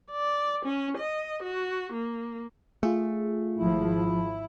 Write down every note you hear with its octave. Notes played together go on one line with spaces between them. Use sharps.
D5
C#4
D#5
F#4
A#3
A3 F4 G#4
G#1 F3 E4